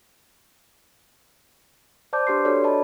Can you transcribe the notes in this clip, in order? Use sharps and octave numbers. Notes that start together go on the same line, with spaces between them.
C5 D5 A5 D6 G6
D4 G4 B4 C6 C7
D4 F#4 A4 B4 C#5 D5
D5 D#5 A5 B5